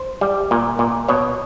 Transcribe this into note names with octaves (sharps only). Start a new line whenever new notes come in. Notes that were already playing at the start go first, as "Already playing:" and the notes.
Already playing: C5
G3
A#2
A#2
B2 C#5